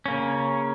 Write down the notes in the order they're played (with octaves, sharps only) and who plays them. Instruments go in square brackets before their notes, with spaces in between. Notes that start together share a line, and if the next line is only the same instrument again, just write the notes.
[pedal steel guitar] C#3 A#3 C#4